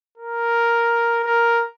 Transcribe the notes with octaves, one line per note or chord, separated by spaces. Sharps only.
A#4
A#4